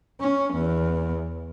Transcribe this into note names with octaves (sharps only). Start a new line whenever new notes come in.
C#4
E2